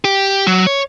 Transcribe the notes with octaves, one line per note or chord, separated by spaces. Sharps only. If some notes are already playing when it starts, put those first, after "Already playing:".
G4
F#3
C#5